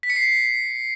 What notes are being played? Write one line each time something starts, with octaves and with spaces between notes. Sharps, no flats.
B6
C#7
C7